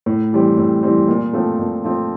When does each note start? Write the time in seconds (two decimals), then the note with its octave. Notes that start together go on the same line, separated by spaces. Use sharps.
0.06 A2
0.33 E3 G3 C4
0.58 A2
0.83 E3 G3 C4
1.08 A#2
1.33 F3 A3 C4
1.59 A#2
1.84 F3 A3 C4